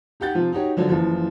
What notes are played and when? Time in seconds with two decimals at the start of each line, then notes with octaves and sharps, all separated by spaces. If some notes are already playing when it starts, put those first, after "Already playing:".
0.20 D#4 G4 F#5 G6 A6
0.34 C3 F3 F4
0.52 D#4 F#4 G4 C#5
0.77 D3 F3 F#3 D4
0.89 F#1 E3 F3